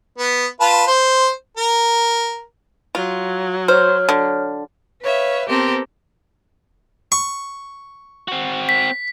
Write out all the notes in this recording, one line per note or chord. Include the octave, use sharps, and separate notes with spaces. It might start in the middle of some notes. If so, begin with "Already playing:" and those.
B3
F4 B4 A5
C5
A#4
F#3 F4
C5 C#5 F6
D3
B4 C#5 E5 F5
B3 C4 G4 A4 A#4 C5
C#6
C4 F#4
B6